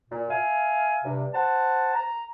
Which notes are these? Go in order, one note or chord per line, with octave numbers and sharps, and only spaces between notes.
A#2
E5 F5 G#5
G2 C3
C5 F#5 A5
A#5